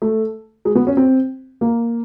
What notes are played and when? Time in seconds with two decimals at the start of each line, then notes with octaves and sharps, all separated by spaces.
0.02 A3
0.65 G#3
0.75 B3
0.87 C#4
0.97 C4
1.61 A#3